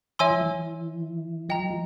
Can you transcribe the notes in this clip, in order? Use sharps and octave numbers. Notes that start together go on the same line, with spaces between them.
E3 C#5 E5 G#5 C6 E6
F3
E3
F3 D#5 G5 A#5
F#3
F3